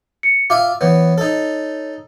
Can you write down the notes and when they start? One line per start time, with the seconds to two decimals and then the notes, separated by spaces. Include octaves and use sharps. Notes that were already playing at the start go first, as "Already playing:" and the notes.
0.23 C#7
0.50 F4 E5 F5 D6
0.81 E3 B3 C#5
1.18 D#4 A4